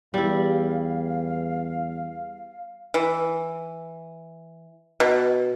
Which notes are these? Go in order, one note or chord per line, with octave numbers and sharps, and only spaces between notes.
E2 G3 E4 F5
E3
B2